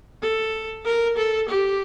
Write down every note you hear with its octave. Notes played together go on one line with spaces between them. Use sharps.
A4
A#4
A4
G4